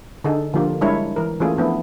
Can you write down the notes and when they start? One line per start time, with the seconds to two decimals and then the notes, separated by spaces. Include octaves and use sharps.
0.24 D3 D#4 G#4 A4
0.53 D3 F3 A#3 F4 G4 A#4
0.81 G3 G#3 D4 E4 A#4 C#5
1.16 E3 A#4
1.40 E3 A3 A#3 C#4 F4 G#4
1.57 F3 A3 B3 D4 E4